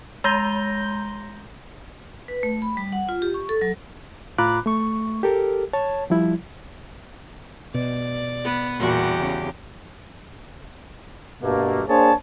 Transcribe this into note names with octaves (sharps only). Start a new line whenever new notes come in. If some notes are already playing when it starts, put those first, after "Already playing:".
G#3 A#5 C6 G6 A#6 G7
B4
A3
B5
G3
F#5
F4
G4
C#6
A4
F#3
A2 F4 A#5 B5 D6 F#6
A3 C#6
G4 A4 A#4
C#5 A5
F3 G3 E4
B2 D5
B3
E2 A#2 G3 F#4 G4
C#3
G2 B2 A3 A#3
A#3 D4 G#4 C5 C#5 A5